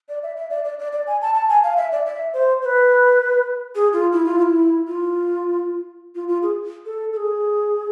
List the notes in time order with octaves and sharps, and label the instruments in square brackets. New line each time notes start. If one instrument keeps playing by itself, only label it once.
[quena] D5
E5
E5
D5
D5
D5
D5
G#5
A5
A5
G#5
F5
E5
D5
E5
C5
C5
B4
G#4
F4
E4
F4
F4
E4
F4
F4
F4
G#4
A4
A4
G#4